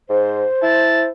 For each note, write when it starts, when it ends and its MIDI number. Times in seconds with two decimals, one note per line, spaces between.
0.09 0.44 44
0.09 1.10 72
0.62 1.07 64
0.62 1.02 81